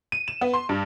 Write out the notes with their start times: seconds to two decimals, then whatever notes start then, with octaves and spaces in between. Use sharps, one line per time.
0.12 D#7
0.28 E7
0.41 B3
0.54 C6
0.69 G2